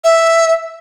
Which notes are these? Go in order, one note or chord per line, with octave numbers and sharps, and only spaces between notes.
E5